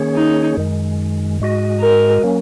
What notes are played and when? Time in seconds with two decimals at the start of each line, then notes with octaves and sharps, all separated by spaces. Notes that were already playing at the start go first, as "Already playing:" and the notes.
Already playing: D#3 A#3 C#4 G#4 C#5
0.15 D#4
0.57 F#2 D#3 G#3
1.40 G#2 G#3 F#4 D#5
1.81 A#4
2.24 F#3 A#3 C#4